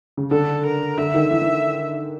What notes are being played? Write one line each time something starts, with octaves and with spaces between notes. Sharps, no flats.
C#3
D3 A4
A#4
D3 E5
D#3
E3
E3